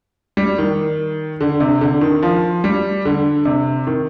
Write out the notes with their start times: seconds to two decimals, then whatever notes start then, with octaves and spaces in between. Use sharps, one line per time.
0.37 G3
0.58 D#3
1.41 D3
1.60 C3
1.81 D3
2.01 D#3
2.23 F3
2.64 G3
3.05 D3
3.45 C3
3.87 D#3